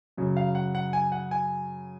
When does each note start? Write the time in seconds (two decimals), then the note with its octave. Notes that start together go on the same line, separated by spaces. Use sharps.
0.17 F#2 C#3 F#3
0.37 F5
0.55 F#5
0.75 F#5
0.93 G#5
1.12 F#5
1.31 G#5